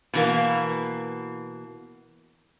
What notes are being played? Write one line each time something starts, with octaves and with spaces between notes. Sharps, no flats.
B2 E3 A#3